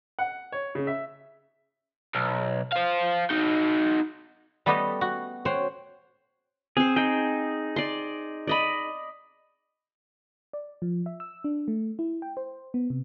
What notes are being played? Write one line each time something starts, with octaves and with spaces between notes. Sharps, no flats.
F#5
C#5
C#3
E5
B1
C5 F5
D#4 F#4
G3 A3 B3 G4 B4 D#5
F#4
C5 C#5 F#5 G5 C6
C4 G#4 C5
D#4 G#4 G5
D5 C6
D5 D#5 B5
D5
F3
E5
E6
D4
A3
E4
G5
C5
B3
C3